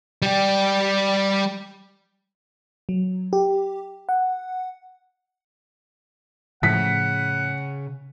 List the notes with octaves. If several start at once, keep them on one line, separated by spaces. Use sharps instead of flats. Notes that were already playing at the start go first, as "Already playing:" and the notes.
G3 G4
F#3
G4
F#5
A2 C#3 F3 F#5 B6